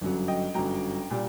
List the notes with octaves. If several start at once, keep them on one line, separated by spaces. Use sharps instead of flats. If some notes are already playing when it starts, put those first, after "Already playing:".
G1 F#2 F#3
D#5 G5
G1 F#2 F#3 G5 A#5
A#2 G3